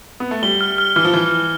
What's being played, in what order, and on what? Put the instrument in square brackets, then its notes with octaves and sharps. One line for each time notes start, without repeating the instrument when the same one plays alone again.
[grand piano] B3
A3
[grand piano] G3 [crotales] G7
[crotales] F6
F6
[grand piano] E3 [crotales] F6
[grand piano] F3
[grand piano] E3 [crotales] F6
[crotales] F6